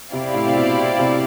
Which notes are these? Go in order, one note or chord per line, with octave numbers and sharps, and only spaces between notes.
C3 C4 E4 G4 D5 F5
A2
C3
B2
C3